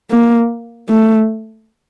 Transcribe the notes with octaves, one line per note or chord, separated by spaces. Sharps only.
A#3
A3